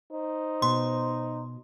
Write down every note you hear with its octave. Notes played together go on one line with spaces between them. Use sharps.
D#4 C5
B2 C6